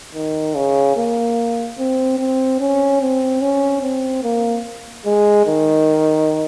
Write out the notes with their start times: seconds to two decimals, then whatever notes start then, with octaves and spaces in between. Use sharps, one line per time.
0.15 D#3
0.55 C#3
0.97 A#3
1.79 C4
2.19 C4
2.60 C#4
3.01 C4
3.41 C#4
3.83 C4
4.23 A#3
5.05 G#3
5.46 D#3